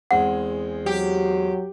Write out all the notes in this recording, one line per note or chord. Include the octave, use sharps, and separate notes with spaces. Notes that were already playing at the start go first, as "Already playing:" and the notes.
E2 G#3 C4 F#5
F#3 G4